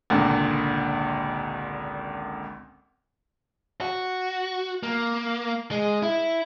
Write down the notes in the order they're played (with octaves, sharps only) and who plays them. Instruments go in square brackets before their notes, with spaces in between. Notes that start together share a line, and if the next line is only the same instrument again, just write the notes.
[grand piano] G#1 C#2 A#2 D3
[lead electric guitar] F#4
A#3
G#3
E4